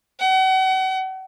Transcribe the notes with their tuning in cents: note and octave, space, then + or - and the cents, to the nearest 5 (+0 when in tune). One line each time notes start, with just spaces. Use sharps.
F#5 +40